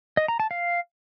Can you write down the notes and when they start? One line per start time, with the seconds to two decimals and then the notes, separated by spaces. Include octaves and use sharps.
0.17 D#5
0.28 A#5
0.40 A5
0.51 F5